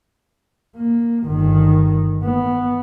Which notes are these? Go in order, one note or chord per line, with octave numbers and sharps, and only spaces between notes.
A#3
G1 D#3
B3